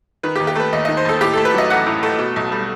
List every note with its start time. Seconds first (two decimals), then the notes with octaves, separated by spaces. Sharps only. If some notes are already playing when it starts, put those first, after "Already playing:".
0.23 D#3 B4
0.35 G4
0.39 D#2
0.47 G4
0.56 A3 B4
0.73 D#2 D#5
0.85 D#3 D#5
0.97 C5
1.05 D#2 A4
1.21 A2 G4
1.33 A3 A4
1.45 B4
1.54 F#3 D#5
1.70 A1 F#5
1.86 A2
2.03 A3
2.19 B2
2.36 B1
2.52 G3